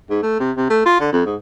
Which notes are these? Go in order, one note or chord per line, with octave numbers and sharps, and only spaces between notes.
G#2
A3
C3
C3
A3
F4
D3
F2
G#2